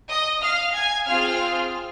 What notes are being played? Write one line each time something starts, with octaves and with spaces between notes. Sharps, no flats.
D#5 D#6
F5 F6
G#5 G#6
C4 F4 G#4 F5 F6